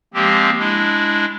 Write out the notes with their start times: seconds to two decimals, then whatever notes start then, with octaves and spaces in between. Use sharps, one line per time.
0.14 F3 G#3 A#3 C4 G4
0.59 G#3 D4 E4